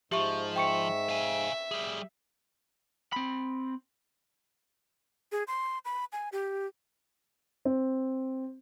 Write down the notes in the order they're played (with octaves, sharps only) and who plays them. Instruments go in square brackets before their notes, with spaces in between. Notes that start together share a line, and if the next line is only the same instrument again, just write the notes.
[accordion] G#2 [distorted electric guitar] F3 [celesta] G4 E5 C#6
[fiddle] E5 [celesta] G5 C#6 C#7
[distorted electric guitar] F5 G#5
G3 G#4
[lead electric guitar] C4 B5
[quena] G#4
C6
B5
G#5
G4
[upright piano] C4